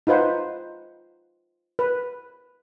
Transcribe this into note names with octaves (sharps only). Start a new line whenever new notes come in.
D#4 F4 B4 C5 F#5
B4